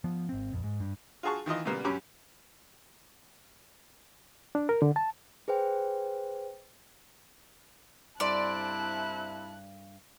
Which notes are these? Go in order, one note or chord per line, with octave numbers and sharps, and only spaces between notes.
F3 B3
G#1 C4
A#1 F2
G#2
G2
F4 F#4 G#4 A5 C#6
D#3 E3 F4 D#5
A#2 C#3 G3 A#3 B3
F#2 F#3 C#4 G4 B5 D6
D4
A#4
D3
A5
G#4 B4 C5 G5
G2 C3 E4 A4 C5 D5 A5 F#6